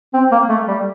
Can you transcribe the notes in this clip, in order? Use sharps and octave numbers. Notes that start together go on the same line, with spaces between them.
C4
A#3
A3
G3